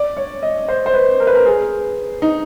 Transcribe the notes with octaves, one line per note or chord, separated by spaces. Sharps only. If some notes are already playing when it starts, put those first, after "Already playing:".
Already playing: D5
C#5
D#5
C5
C5
B4
A#4
B4
A#4
G#4
D#4